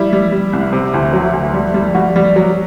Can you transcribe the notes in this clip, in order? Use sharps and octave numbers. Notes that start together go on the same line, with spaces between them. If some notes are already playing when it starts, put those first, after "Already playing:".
Already playing: G3 E4
G3
G3
C2
C3
D2 E4
F#3
D2
G3
G3
G3 F#4
G3
F#3